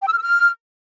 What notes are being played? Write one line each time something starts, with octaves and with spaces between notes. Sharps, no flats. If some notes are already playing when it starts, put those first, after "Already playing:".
G5
E6
F6
E6
F6